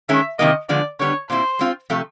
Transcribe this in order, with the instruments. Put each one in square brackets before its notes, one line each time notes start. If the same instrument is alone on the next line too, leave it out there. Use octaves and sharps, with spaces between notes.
[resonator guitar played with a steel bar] D#3 G#3 C#4 [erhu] E5
[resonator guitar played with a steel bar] C3 D#3 F#3 A#3 [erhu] D#5
[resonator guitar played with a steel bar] D3 F3 G#3 B3 [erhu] D5
[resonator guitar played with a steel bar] D3 G3 B3 [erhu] C#5
[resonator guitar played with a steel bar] A#2 G3 C4 E4 [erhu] C5
[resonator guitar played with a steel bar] G#3 C4 F4
C3 F3 A3